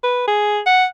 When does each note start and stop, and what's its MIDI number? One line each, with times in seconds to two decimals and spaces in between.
0.04 0.23 71
0.28 0.61 68
0.66 0.85 78